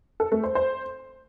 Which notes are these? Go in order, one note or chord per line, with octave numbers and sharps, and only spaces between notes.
A4
A3
C5
C5